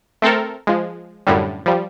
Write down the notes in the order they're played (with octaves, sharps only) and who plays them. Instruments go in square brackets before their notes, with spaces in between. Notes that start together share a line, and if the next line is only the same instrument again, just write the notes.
[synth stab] A3 C4 A4 A#4
F3 G#3
F#2 A2 D3 G3
F3 G3